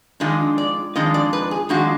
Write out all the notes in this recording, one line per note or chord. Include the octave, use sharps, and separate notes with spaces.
F2 D#3 G#3 D4 F4 D#5
D5
F2 D#3 G#3 D4 F4 D#5
D5
B4
G#4
F2 D#3 G#3 D4 F4 F#4